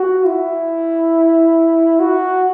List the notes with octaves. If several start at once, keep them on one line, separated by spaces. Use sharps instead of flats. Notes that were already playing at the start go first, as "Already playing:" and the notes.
Already playing: F#4
E4
F#4